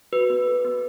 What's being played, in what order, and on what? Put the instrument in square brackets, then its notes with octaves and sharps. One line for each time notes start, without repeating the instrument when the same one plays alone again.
[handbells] F#4 B4
B3
A4
B3